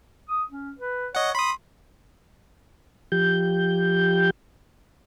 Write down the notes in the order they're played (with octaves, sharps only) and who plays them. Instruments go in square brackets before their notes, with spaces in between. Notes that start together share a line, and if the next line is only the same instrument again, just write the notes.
[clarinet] D#6
C#4
B4
[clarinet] C#5 [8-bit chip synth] D#5 F#5
[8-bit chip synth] B5 D#6 [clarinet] C6
[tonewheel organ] F3 G4 G6